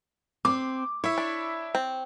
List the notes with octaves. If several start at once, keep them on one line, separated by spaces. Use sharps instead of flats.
C4 D6
E4 C#5 E5
D4
C4